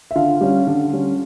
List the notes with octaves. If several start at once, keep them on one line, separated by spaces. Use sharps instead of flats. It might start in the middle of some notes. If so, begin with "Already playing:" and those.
E5
D3 F4 F5
G3 C#4
D3
G3 C#4